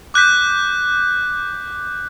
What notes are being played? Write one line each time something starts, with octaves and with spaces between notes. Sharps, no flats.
D6 F#6 G6 B6